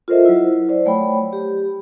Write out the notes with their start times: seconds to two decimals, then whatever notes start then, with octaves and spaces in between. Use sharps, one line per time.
0.08 F4 A4 A#4 C5 D#5 E5
0.25 F#3 E4
0.69 C5 D5
0.85 F#3 A3 C#5 G5 B5
1.33 G4